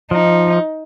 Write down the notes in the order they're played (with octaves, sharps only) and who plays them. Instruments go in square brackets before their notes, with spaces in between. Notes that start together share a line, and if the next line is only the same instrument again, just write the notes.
[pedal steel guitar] F3 [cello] D#4